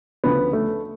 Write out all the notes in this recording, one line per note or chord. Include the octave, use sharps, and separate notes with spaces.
D2 C#3 F3 B3
A3